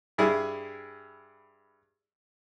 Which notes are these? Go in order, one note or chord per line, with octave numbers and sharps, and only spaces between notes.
G2 E4 G#4